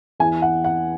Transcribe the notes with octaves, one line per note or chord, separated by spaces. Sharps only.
E2 E3 G#5
F#5
F#5